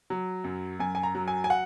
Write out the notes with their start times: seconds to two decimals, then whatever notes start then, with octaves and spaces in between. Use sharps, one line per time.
0.10 F#3
0.44 F#2
0.79 F#2 G#5
0.95 G#5
1.03 A#5
1.15 F#3
1.28 G#5
1.44 G#5
1.50 F#5